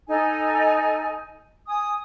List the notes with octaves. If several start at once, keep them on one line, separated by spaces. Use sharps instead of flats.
D#4 A4 G#5
G#5 D#6